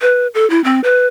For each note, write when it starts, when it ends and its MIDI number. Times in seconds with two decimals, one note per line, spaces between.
0.02 0.27 71
0.34 0.48 69
0.50 0.63 64
0.64 0.80 60
0.84 1.07 71